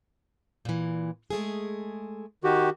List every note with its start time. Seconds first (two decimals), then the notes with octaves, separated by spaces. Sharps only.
0.65 A#2 E3
1.30 G#3 A3 G#4
2.44 D#3 F#4 G4